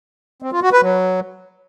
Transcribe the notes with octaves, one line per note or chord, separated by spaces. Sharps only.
C4
F4
F#4
B4
F#3